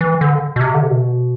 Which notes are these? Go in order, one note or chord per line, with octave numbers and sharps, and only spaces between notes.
E3
D3
B2
C3
D3
C3
B2